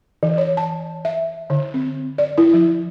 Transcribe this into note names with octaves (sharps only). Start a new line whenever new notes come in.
E3
C#5
A5
E5
D3
C4
D5
E4
F3